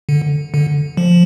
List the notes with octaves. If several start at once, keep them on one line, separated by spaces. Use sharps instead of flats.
D3
D3
F3